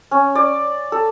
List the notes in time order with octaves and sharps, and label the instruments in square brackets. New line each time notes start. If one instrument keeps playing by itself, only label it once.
[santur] C#4
D5
A4